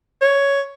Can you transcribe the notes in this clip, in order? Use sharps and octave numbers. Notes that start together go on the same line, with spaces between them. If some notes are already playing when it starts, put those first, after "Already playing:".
C#5